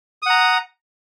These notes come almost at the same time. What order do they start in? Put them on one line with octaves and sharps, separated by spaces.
D#6 F#5 A#5